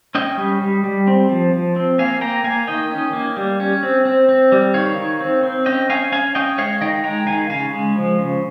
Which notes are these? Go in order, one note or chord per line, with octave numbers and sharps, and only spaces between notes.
C#4 D#5 G5
G3
G3
G3
C4
F3
F3
C4
A#3 F5 G#5
A#3 G5 A#5
A#3 F5 G#5
D#3 D#5 G5
C#4
A#3
G3
C#4
C4
C4
C4
G3
D#3 C#5 F5
D#3
C4
C4
C#4 D#5 G5
C#4 F5 G#5
C#4 F5 G#5
C#4 D#5 G5
G#3 C#5 F5
D#3 D#5 G5
G#3 G5 A#5
D#3 F5 G#5
C#3 F5 G#5
G#3
F3
C#3